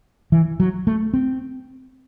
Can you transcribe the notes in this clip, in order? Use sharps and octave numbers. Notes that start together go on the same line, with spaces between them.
E3
F#3
A3
C4